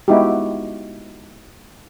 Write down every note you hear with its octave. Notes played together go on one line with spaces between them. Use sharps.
G#3 B3 D#4 E4 F#4 G4